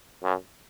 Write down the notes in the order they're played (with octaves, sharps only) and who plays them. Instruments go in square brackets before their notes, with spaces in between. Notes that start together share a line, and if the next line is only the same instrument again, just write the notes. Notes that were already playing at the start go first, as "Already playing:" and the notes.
[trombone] F#2